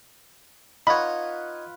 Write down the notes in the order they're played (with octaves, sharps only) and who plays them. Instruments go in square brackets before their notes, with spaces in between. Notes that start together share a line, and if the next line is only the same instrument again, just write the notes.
[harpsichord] D#4 C#5 [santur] F4 B4 F#5 [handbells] B5